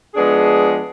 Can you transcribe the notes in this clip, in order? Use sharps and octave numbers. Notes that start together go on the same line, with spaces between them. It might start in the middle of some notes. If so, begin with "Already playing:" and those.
F3 G#3 B3 D4 G#4